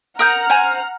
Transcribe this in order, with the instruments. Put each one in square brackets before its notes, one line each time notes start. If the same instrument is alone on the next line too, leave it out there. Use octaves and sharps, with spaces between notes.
[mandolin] A#4 D#6 G6 [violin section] F#5 A#5 F6
[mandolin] C5 G#5